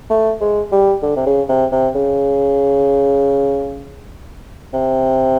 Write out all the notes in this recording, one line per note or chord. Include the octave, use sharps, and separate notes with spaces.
A3
G#3
G3
D3
C3
C#3
C3
C3
C#3
C3